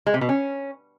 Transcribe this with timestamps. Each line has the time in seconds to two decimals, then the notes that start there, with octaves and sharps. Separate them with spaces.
0.06 G#3
0.14 C3
0.21 B2
0.29 C#4